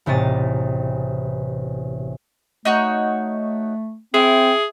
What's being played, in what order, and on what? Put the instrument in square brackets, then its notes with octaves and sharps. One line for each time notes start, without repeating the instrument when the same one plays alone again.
[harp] E1 A1 C3 D#5 A6
[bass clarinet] A3 [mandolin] D#4 F#4 C#5
[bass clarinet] C4 [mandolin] E4 [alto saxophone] G#4